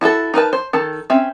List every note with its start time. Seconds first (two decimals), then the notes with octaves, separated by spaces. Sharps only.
0.01 E4 F#4 G#4 A4
0.34 D#4 A#4 B4 A5
0.53 C5
0.73 D#3 A4 A5
1.10 C4 C#4 E5